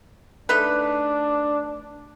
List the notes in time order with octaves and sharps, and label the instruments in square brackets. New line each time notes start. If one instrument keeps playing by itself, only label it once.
[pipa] A3 D#4 B4 [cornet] D4